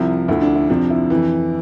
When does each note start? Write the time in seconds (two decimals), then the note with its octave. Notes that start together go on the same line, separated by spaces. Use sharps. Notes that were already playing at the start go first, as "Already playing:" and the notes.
Already playing: C2 C3 F3 E4
0.28 D2 D3 F3 E4
0.41 D4
0.55 E4
0.69 F2 C3 F3 D4
0.90 E4
1.10 F2 E3